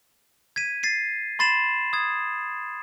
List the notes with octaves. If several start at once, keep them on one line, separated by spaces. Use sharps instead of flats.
G#6 B6 D#7
A6 C7 D#7
B5 C6 A6 C7 E7 F#7
D#6 G#6